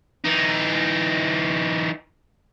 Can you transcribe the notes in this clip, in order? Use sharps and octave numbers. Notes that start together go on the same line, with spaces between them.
E3 D#4